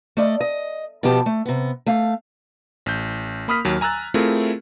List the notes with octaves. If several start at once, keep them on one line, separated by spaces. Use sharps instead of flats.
A3 D5 D#5
D#5
B2 F3 B3 G4 A5
A3
C3 B3
A3 F5
A1 G6
A#3 B5 D#6 F6 B6
D#2 F#3
G#5 A#5 E6 F#6 A6
A3 C4 E4 F4 G#4 A#4